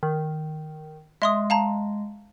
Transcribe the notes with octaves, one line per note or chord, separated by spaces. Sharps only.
D#3
G#3 E5 C6 D#6
F5 A5 A#5